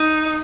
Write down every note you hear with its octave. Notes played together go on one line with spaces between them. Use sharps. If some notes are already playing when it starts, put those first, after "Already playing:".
Already playing: D#4